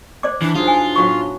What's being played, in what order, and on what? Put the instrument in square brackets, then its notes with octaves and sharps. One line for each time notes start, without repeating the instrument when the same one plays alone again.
[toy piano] C5 D5 D6
[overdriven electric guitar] E3 [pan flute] D4
[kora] G#2 F#3 G#4 [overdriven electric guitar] F4
[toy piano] G#5
[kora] A2 F#3 B3 [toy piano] F5 C#6